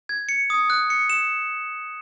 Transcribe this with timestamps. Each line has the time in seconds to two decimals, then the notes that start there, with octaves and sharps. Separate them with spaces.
0.09 G#6
0.29 C#7
0.50 D#6
0.70 F#6
0.90 C#7
1.10 E7